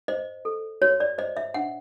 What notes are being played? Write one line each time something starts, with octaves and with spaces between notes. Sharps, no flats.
C5 D#5
A4
F#4 C#5
D5
C5 D#5
E5
D4 F#5